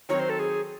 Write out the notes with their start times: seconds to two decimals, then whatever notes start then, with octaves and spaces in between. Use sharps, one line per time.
0.09 D#3 F#3 C4 C#5
0.19 C5
0.30 A4
0.39 G#4